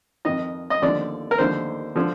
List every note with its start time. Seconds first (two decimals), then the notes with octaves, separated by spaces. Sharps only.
0.25 F2 D#3 D#5
0.70 D#5
0.82 D#2 D3 F3 D5
1.31 A#4
1.38 D#2 D3 F3 C5
1.96 D3 F3